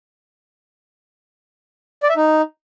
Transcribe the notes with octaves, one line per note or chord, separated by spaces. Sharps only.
D5
E5
D#4